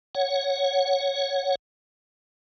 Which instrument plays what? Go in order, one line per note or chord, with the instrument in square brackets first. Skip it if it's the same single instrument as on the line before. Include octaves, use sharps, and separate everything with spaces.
[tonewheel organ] C#5 F#5